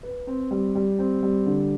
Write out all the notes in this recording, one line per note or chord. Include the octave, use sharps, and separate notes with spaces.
B4
C4
G3
G3
C4
G3
D3